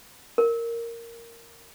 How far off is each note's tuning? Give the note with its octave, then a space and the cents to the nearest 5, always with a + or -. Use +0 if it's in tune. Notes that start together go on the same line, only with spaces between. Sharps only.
A#4 -5